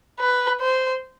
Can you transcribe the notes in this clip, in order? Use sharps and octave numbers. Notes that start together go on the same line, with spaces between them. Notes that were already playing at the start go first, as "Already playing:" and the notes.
B4
C5